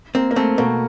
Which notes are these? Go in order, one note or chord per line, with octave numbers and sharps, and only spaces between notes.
A#3 C4
A#3
A3 C4
B2 A#3